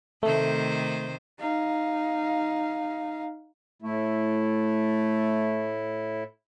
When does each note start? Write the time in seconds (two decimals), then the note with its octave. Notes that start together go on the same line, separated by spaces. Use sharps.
0.23 C3 D#3 A3 C5
1.39 D#4 F5
3.82 A2 A3 E4